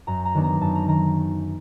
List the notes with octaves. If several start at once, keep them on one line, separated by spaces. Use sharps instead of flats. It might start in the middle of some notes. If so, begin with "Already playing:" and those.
F#2 A#5
A#5
D#3 F#3 B3 D4
A#5
F#2 A5
A#5
D#3 A#5